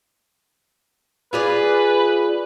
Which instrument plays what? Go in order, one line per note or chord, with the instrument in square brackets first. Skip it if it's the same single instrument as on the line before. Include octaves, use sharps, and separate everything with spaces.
[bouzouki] F4 G#4 D5 [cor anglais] B4